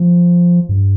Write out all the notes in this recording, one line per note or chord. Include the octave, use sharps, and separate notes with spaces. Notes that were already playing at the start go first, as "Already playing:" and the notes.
Already playing: F3
G2